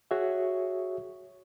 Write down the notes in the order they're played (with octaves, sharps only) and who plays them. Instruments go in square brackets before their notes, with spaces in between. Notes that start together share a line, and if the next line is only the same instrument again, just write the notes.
[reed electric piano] F#4 G#4 C#5 E5